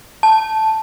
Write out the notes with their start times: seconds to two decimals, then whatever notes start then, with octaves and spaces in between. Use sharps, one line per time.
0.23 A5